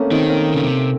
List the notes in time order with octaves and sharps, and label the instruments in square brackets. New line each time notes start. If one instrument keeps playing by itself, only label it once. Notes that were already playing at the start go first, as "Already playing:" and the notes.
Already playing: [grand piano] A3 A#3 C4 C#4
[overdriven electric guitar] D#3 [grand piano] C4 D#4
[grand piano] A#3 C#4
[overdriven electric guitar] C#3
C3